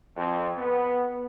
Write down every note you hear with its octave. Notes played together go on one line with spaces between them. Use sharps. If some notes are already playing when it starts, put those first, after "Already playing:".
F2
B3